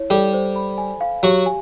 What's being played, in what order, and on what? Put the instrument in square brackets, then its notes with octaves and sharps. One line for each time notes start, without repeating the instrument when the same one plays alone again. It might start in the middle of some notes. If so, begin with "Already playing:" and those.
Already playing: [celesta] E4 C#5
[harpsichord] G3 G4 [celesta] A4
[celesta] C5
B5
G#5
F5
[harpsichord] F#3 F#4 [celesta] G4
[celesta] G#5